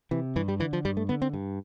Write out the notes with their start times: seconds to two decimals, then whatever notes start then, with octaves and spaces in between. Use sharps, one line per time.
0.11 C3 E3
0.36 G2 E3
0.48 G3
0.60 D3 E3
0.73 F3
0.85 G2 G3
0.97 A3
1.09 D3 B3
1.22 C4
1.34 G2